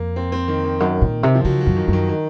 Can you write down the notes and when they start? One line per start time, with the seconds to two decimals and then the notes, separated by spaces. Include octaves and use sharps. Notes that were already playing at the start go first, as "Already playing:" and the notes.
Already playing: F2 A#3
0.16 C4
0.32 C4
0.48 D#3
0.64 D#3
0.80 F#2 D#3
1.02 A#2
1.23 C3
1.35 F3
1.45 C#3 F#3
1.60 F#3
1.66 F#2
1.77 D#3
1.88 F#2
1.93 D#3
2.09 D#3